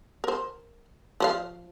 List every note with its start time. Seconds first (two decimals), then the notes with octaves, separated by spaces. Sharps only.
0.24 A#4 C5
1.20 F3 C5 F5